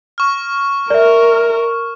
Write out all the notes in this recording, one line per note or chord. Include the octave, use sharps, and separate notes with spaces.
C#6 F6
A#4 D5 E5